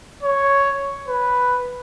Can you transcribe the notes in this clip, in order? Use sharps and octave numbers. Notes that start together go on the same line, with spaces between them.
C#5
B4